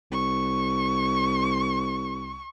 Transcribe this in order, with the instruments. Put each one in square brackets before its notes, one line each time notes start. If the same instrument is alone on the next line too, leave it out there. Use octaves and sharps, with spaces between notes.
[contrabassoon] C2 [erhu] C#6